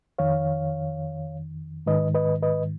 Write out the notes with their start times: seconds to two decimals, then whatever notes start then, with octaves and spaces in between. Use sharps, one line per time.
0.19 F2 D#3 C#5 F5
1.86 G#2 D#3 B4 D#5
2.15 B4 D#5
2.43 B4 D#5